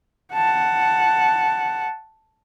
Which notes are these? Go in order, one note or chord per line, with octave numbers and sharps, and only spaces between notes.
F#5 A5